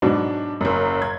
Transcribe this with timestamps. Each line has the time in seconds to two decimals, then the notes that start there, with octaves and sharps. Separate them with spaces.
0.02 G#2 B2 F#3 D4
0.61 F#1 F#2
1.02 G#6